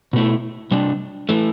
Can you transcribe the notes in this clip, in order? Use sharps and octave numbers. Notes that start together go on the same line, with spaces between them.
B2 A3 E4
C3 G3 D4
E3 A3